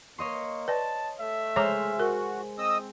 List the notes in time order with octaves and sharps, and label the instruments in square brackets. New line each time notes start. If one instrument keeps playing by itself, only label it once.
[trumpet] A#3 [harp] C#5 D#5 C6
[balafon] B4 D5 [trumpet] A5
[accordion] A3 [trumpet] E5
[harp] G#3 C5 F6 [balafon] C#5 A#5 D6
[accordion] F#4 [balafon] A#4
[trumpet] C4 [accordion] D#5 D#6 E6